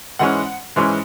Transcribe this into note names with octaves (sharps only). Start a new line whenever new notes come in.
G#2 E3 G#3 C#4 F#5
G#2 E3 G#3 C#4